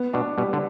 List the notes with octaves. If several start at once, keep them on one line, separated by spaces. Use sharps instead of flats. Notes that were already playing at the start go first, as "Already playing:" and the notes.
Already playing: B3
B2 D4
B2 G3
D3